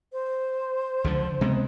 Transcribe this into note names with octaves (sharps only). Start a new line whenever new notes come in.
C5
C#2 D3 F3
C3 G#3 B3